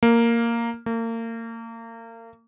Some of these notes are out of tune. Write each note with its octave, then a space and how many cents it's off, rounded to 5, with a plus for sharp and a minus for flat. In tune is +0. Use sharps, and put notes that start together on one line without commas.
A#3 -5
A#3 -35